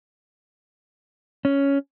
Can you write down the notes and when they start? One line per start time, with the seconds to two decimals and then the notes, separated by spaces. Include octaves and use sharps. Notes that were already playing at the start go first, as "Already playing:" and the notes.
1.45 C#4